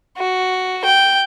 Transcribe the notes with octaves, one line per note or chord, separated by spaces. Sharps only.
F#4
G5